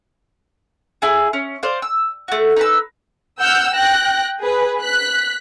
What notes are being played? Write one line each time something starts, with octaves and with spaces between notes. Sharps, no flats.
E4 G#4
C#4
C5 D5 F5
E6
A3 F#4
D#4 B4 E6
F#5 E6 F6 G6
G5 F#6 A#6
G#4 B4
F#6 B6